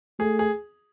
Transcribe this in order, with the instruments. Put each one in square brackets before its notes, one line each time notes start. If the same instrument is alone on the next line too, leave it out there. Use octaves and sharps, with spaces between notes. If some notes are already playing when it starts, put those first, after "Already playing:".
[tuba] A3 [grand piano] G#4
[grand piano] G#4